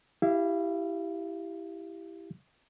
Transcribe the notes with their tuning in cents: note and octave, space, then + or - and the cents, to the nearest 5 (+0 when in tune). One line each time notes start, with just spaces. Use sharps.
E4 +0 G4 +0 F5 -30